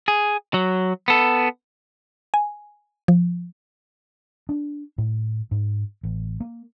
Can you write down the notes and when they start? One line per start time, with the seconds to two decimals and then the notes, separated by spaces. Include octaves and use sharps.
0.08 G#4
0.54 F#3
1.08 B3 A4
2.34 G#5
3.08 F3
4.49 D4
4.98 A2
5.51 G#2
6.03 A1
6.40 A#3